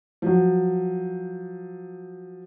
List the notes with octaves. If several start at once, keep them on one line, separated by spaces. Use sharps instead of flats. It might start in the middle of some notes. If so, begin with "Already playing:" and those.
F3 F#3